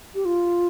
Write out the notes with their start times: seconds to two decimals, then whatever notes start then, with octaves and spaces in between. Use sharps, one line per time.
0.15 G4
0.25 F4